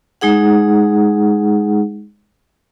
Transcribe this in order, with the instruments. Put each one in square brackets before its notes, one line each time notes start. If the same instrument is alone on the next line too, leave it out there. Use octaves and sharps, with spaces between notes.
[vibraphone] G#3 D#4 G#4 F#5